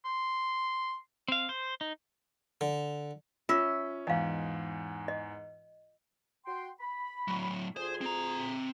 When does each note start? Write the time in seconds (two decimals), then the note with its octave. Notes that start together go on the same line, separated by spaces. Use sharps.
0.05 C6
1.28 C4 F5
1.49 C5
1.81 D#4
2.61 D3
3.49 C#4 F4 E5
4.07 E2 G#2 D#5 F5
5.08 D#5
6.46 F#4 G5 C6
6.80 B5
7.28 A2 F#3
7.77 D2 F4 G#4 C5
8.01 C4 A#5